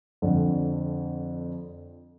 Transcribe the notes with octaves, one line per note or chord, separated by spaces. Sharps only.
F2 D3